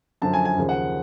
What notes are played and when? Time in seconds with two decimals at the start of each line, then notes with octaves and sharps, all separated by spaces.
0.22 F#2 D3 F3 A5
0.33 G#5
0.45 G#5
0.57 D#2 C#3 F3
0.69 F#5